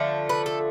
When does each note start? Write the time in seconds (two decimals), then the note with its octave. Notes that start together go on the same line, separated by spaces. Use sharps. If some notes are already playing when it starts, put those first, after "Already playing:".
Already playing: D3 F3 A3
0.29 B4
0.46 A4